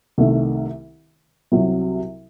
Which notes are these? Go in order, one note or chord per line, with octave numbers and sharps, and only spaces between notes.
C2 C3 D#3 A3
C2 C3 F#3